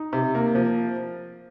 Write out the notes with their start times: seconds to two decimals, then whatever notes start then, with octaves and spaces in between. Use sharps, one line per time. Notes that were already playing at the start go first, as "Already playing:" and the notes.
Already playing: D#4
0.13 C3
0.35 A#3
0.55 F3